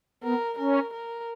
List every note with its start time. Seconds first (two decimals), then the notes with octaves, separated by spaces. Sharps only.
0.24 B3 A#4
0.58 C#4 A#4
0.93 A#4